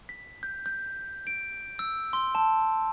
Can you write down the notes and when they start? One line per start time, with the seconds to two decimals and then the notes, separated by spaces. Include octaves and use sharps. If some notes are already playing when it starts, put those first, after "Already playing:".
0.09 B6
0.43 G6
0.66 G6
1.27 D7
1.79 E6
2.13 C6
2.35 A5